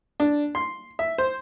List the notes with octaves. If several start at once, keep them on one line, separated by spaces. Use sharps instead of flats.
D4
C6
E5
C5